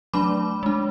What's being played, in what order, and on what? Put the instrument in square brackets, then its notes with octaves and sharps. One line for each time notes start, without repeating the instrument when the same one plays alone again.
[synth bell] F#3 A3 D4 B5 D6
G#3 D4